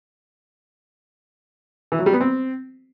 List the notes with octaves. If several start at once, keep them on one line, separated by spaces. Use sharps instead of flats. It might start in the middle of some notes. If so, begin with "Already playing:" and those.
E3
F#3
G3
B3
C4